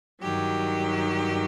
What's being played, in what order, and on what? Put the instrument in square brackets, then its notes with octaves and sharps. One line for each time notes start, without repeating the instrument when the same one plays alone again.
[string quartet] G2 D#3 F#3 G4